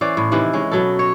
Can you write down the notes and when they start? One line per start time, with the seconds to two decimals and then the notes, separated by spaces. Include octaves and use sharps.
0.01 E3 C#4 C5 D5
0.17 A2
0.32 C3 D#3 E3 E4
0.53 G#3 C#4
0.71 B2 F#3 A4
0.99 C#5